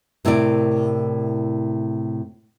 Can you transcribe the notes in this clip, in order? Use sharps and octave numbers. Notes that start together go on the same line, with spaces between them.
A2 C3 E4 A#4 D5